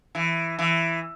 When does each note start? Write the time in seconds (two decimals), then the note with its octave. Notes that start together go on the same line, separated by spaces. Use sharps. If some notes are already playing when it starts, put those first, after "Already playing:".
0.15 E3
0.59 E3